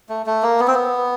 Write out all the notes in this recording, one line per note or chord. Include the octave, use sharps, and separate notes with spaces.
A3
A3
A#3
B3
C4
B3